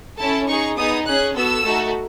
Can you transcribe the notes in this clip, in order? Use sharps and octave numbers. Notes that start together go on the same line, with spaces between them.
C#4 E4 A4 A5
D#4 G#4 C#6
B3 D#4 G#4 D#6
C#4 G#4 F#6
B3 F#4 A4 E6
A3 D#4 F#4 A4